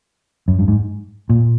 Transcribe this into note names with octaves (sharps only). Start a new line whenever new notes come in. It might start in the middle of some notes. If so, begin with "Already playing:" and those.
F#2
G2
G#2
A#2